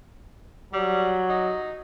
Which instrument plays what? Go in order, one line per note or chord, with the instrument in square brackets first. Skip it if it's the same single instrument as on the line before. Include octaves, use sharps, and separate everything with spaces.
[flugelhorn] F#3 [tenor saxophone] G3
[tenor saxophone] D#4